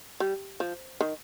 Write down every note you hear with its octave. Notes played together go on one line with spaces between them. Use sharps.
G3
F3
D#3